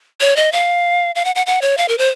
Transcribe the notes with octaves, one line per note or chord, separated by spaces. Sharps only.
C#5
D#5
F5
F5
F#5
F#5
F#5
C#5
F5
A#4
C5